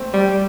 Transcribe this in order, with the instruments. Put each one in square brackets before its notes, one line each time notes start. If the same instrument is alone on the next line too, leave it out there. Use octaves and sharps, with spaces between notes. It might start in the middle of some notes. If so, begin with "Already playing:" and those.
Already playing: [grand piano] A3 C4
[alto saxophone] G3